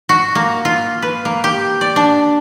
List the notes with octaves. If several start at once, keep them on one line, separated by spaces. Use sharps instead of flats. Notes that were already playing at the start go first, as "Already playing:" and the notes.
F#4
A#3
F4
B4
A#3
G4
D5
D4